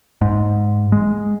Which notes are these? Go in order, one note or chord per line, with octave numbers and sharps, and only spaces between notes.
G#2
G#3